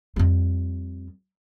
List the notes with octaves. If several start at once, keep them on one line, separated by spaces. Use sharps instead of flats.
F2 G3